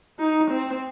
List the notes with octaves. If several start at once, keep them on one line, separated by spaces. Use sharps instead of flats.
D#4
C4